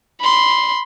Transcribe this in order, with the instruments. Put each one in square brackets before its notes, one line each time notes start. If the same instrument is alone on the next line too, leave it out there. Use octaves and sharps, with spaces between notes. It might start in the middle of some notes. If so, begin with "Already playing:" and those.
[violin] B5 C6